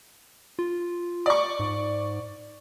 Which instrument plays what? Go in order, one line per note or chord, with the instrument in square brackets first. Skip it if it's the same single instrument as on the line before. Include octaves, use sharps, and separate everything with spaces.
[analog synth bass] F4
[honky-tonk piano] D5 C#6
[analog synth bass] G#2